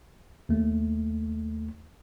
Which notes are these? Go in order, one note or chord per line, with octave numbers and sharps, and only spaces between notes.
D#2 A3